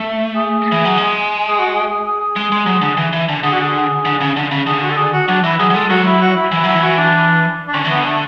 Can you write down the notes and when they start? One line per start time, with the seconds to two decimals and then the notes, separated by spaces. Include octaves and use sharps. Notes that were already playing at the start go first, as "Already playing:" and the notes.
Already playing: A3
0.35 G#4
0.72 E3
0.85 F#3
0.98 G#3
1.48 G#4
1.59 F#4
1.75 G#4
1.90 G#4
2.05 G#4
2.20 G#4
2.36 G#3
2.52 G#3
2.66 F#3
2.82 D3
2.97 E3
3.13 E3
3.29 D3
3.43 D3 G#4
3.53 F#4
3.61 G#4
4.05 D3
4.21 C#3
4.36 D3
4.51 C#3
4.67 D3 G#4
4.82 F#4
4.90 A4
4.97 G#4
5.13 F#4
5.28 F#3 D4
5.44 E3 E4
5.59 F#3 G#4
5.70 F#3
5.74 G#3 A4
5.90 F#3 F#4
6.06 E4
6.21 F#4
6.36 E4
6.52 E3 E4
6.64 F#3 E4
6.75 E3
6.83 F#4
6.98 D4
7.68 D4
7.74 D3 C#4
7.85 E3
7.90 D3 B3
8.06 A3